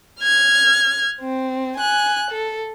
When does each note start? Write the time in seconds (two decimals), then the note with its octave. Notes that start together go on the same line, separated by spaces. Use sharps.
0.22 F6 G#6
1.21 C4
1.76 G#5 F#6
2.31 A4